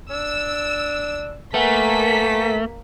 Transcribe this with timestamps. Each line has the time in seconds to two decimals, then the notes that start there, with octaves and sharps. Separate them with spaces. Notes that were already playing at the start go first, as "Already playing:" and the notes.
0.11 D4 E6
1.54 A3 A#3 A4 B4 F#5 G#5 B6